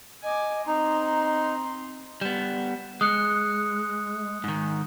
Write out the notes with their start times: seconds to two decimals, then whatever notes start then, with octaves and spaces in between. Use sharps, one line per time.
0.23 D#5 G#5 D6
0.67 C4 D#4 A#5 C6
2.21 G3 B3 E7
3.01 G#3 D#6 F#6 C#7
4.44 G#2 D#3